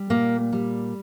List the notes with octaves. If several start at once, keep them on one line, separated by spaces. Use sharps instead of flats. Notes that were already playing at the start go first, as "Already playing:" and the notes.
Already playing: G3
A#2 A#3
G3